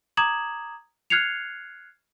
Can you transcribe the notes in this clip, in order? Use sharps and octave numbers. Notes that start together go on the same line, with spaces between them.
A#5 D6 D#6 G#6 E7 F#7
F6 F#6 G#6 C7 C#7 F7